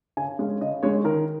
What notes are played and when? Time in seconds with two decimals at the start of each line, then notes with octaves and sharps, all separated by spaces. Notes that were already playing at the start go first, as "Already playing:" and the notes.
0.17 C#3 G#5
0.39 G#3 C#4 F5
0.61 C#3 D#5
0.83 G#3 C#4 C#5
1.04 D#3 A#4